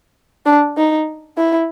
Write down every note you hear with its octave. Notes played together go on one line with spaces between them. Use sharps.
D4
D#4
E4